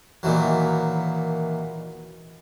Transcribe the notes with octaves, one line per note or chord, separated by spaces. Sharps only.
A#2 D#3 E3 F#3